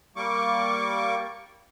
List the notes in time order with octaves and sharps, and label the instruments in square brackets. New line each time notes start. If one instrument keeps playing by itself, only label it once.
[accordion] G3 A#3 C#6 D6